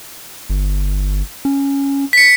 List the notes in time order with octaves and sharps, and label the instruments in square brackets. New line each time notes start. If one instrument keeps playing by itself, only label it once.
[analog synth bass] G1
C#4
[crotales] B6 C#7